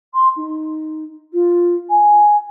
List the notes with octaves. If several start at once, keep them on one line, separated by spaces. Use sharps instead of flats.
C6
D#4
F4
G#5